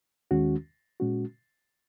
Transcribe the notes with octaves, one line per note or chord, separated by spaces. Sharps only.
D#2 D#3 G#3 C#4 F#4
A#2 G#3 C#4 F#4